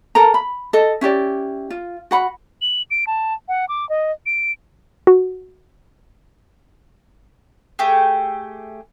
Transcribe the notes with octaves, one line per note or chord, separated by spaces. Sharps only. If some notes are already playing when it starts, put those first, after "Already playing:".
A4 A#4 A#5
B5
A4 D#5
C#4 E4 G4 D5
F4
F#4 F#5 B5
F#7
D7
A5
F#5
D6
D#5
D7
F#4
A3 G4 G#4